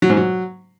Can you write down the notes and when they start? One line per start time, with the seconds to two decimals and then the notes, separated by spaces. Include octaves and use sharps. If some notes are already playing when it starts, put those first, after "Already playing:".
0.02 F#3
0.09 G#2
0.17 F#3